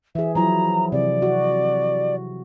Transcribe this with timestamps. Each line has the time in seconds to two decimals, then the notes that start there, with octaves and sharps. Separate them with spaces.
0.15 E3 G#4 E5
0.35 F3 F#3 E4 A#5
0.92 C3 D5
1.22 F#4